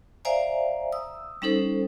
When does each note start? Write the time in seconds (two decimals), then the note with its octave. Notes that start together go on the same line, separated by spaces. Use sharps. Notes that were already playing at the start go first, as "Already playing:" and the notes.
0.25 C5 D5 E5 F5 G#5 A#5
0.92 D#6 E6
1.42 G3 C#4 D#4 A4 C5